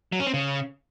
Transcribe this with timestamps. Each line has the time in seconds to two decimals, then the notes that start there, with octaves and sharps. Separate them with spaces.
0.12 F#3
0.20 C#4
0.27 C4
0.34 C#3